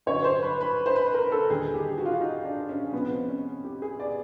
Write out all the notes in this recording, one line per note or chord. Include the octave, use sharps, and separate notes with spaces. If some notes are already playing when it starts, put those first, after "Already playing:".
G2 D3 F#3 C#5
C5
B4
B4
C5
B4
A#4
A4
D#2 D3 G3 G#4
G4
F#4
F4
F#4
D#4
D4
C#4
C#2 C3 F3 B3
C4
C#4
G4
G#4
D5